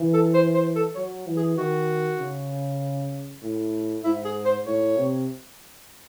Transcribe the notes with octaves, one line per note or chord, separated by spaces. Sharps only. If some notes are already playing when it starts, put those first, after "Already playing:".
Already playing: E3
A4
C5
C5
A4
F#3 C#5
E3
G#4
D#3 F#4
C#3
A2
G#2 E4
G#4
C5
A2 C#5
C3